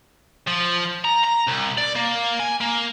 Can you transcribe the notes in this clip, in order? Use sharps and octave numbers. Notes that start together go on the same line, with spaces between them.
F3
A#5
A#5
C2
D5
A#3
G#5
A#3